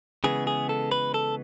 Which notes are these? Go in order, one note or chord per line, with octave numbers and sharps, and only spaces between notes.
C#3 E3 G#3 B3 G#4
G#4
A4
B4
A4